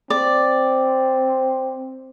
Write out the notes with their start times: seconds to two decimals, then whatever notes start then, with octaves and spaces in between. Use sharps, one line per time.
0.10 C4 D5